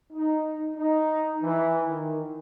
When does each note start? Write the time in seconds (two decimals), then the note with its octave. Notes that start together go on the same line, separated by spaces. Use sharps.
0.13 D#4
0.76 D#4
1.42 E3
1.84 D#3